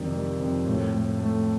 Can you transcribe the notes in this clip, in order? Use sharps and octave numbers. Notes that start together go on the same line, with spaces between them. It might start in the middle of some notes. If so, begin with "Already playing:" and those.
Already playing: F2 C3 D#3 G3
G3
F2
A2
A2
A3